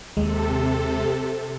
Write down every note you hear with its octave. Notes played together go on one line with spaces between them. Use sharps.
D#2 C3 G#3 A4